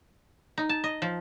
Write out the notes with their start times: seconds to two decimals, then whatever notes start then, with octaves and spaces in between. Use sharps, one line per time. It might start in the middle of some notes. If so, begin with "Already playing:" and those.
0.58 D#4
0.69 A5
0.84 D#5
1.02 F3